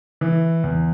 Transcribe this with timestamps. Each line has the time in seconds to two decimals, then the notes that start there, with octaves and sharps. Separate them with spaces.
0.21 E3
0.64 E2